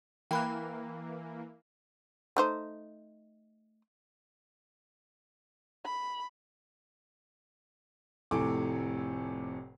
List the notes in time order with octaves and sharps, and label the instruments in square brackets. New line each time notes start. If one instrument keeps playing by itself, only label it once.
[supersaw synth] E3 A#3 [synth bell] G5 B5 F#6
[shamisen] A3 D#4 C5
[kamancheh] B5
[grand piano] F1 A2 C3 A4 G#5 D6